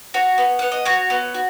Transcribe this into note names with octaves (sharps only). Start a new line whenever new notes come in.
F#4 C#5
B3
B3 F#5
D#5
F#4 C#5
B3
F#4